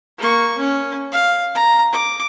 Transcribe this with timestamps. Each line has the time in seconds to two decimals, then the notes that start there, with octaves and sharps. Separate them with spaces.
0.18 A#3 C#6
0.58 C#4
1.12 F5
1.55 A#5
1.93 D6